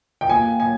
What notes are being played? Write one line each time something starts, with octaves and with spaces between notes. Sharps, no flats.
G5
A#3 G#5
G#5